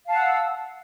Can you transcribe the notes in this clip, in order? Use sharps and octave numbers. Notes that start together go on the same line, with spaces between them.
F5 F#5 A5 E6